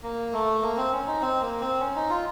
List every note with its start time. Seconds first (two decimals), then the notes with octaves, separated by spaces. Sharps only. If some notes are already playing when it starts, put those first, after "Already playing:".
0.03 A#3
0.33 A3
0.62 A#3
0.77 C4
0.93 C#4
1.07 D#4
1.21 C4
1.41 A#3
1.60 C4
1.80 C#4
1.96 D#4
2.10 F4